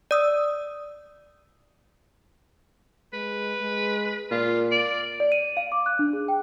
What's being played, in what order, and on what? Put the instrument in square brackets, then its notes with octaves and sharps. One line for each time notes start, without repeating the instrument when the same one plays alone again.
[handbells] D5 D#6 E6
[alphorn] G#3 [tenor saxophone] B4
[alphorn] G#3
[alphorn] A#2 [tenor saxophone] F4
[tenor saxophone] D5
[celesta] D5
D#7
F5
D6
F#6
D4
G#4
G5